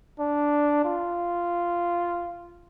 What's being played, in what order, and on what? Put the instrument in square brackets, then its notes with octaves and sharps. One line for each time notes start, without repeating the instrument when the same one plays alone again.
[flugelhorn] D4
F4